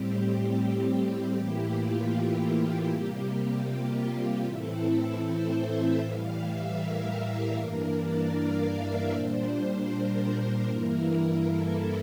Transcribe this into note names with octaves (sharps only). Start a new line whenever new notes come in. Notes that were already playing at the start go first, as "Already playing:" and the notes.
Already playing: A2 G3 C4 G4
G4
A2 E3 A#3 E4 G4
F4
G4
C3 G3 A#3
F4
G4
A2 E3 A3 C4 E4 A4
C5
E5
A2 E3 G3 F5
E5
A#4
G2 E3 A#3 D4 A#4
D5
F5
E5
A#2 G3 D4 C5
A#4
G2 E3 A#3 E4
A4